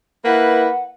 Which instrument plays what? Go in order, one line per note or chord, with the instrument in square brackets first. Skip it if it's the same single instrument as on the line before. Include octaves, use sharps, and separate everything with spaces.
[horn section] A#3 E4 B4 [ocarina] F#5